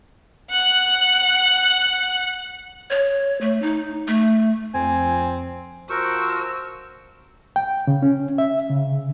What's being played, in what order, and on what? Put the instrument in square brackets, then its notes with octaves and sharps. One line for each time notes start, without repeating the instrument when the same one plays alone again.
[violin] F#5 F#6
[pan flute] C#5
A3
D#4
A3
[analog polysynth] F2 [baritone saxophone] C4 [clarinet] G#5
[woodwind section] F3 F#4 [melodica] A#4 C5 C#6 [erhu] E6
[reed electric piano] G5
C#3
C#4
E5
C#3